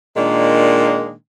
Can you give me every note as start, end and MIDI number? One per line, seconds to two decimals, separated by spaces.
0.16 1.13 46
0.16 1.13 51
0.16 1.13 56
0.16 1.13 58
0.16 1.13 62